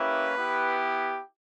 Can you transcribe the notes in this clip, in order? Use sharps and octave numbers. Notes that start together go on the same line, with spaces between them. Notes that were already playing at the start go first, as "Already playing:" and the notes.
Already playing: A#3 C#4 E4 G4 B4
B3 E4 G4